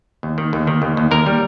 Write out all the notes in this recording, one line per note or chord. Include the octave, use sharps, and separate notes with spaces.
D#2
D#3
D#2
D#3
D#2
D#2
D#2 A#4
G3